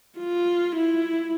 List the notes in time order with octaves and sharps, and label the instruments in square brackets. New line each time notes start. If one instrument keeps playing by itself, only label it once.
[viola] F4
E4